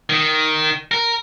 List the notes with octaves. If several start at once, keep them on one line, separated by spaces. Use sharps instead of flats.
D#3
A#4